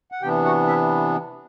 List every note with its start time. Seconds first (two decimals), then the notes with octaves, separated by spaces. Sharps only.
0.12 F#5
0.22 C3 E3 B3 D4 G4 G5
0.45 F#4 F#5
0.67 E4 E5